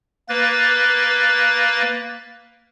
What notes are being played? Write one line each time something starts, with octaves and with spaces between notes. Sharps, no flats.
A#3 B4 A6